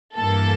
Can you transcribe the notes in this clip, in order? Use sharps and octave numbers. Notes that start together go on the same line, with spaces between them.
G2 E3 A#3 A4